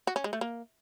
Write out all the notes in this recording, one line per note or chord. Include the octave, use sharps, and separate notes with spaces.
F#4
C#4
G#3
A3
A#3